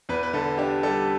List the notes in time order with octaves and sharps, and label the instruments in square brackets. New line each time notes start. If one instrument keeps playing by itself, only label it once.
[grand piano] E2 B4
B4
D3 A4
D4 G4
G3 A4